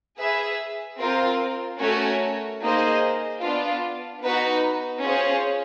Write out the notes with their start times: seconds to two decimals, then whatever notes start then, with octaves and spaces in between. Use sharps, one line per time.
0.20 G#4 B4 E5
0.99 C4 F4 A#4
1.80 A3 C#4 F#4 A#4 C#5
2.61 A#3 D#4 G#4 C5 D#5
3.42 B3 D4 F4
4.23 B3 D#4 F#4 B4
5.05 C#4 F4 G#4 C5